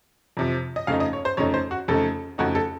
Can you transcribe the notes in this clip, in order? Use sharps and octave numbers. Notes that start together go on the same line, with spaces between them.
F2 C3 F3
D#5
F2 C#3 A3 D#4 F5
D#5
C#5
C5
F2 C#3 A3 D#4 C#5
C5
F#4
F2 C#3 A3 D#4 A4
F2 C#3 A3 D#4 F#4
A4